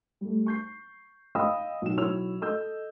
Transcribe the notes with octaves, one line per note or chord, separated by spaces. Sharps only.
G3 A3
C#6 G6 C7
D#5 F5 G5 B5 D#6 E6
B1 F#4 E7
B1 E4 C#5 E6 F7
A4 D#5 E6 G6